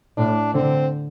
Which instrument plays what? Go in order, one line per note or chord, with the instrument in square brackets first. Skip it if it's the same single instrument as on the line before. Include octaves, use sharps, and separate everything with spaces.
[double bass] A2 [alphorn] D4
[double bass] D3 [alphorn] C4